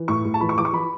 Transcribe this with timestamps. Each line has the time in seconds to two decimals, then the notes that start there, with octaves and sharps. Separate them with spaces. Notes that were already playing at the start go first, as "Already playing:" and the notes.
Already playing: E3
0.08 A2 C#6
0.25 A2
0.34 A5
0.40 E3 B5
0.49 C#6
0.58 E3 D6
0.65 C#6
0.73 E3 B5